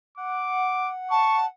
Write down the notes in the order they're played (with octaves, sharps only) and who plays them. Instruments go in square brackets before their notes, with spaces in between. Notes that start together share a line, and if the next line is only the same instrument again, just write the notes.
[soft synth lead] F#5 [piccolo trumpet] D6
[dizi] A5 [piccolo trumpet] C#6